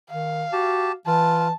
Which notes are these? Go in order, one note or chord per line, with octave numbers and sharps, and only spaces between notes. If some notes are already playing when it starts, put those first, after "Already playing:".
D#3 F5
F#4 G4 A5
E3 F4 A5